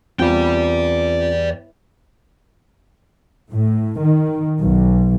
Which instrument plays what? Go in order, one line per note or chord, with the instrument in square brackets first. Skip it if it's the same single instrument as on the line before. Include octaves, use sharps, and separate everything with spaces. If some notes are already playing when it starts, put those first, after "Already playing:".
[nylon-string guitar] E2 [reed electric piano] C4 F4 [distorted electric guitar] D5 G5
[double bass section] A2
D#3
B1